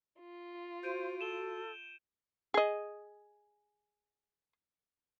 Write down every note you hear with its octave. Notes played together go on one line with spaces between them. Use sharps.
F4
F#4 C5 G6 D7 D#7
A4 D#7 E7 G7
G#4 D#5